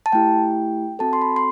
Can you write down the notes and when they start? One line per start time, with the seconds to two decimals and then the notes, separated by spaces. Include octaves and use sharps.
0.06 A5
0.12 A3 E4 G4 G5
0.99 C4 F#4 A4 A5
1.13 C6
1.22 B5
1.36 C6